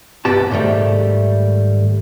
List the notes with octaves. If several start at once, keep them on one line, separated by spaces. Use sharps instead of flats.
C2 G2 B3 G4 A5
G#2 D#3 G3 A3